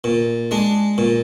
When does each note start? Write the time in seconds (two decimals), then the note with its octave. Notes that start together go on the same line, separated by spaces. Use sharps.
0.04 A#2
0.51 G#3 D4
0.98 A#2